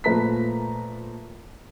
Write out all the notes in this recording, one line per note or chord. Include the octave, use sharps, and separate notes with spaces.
A#2 F3 A3 B4 A#5 B6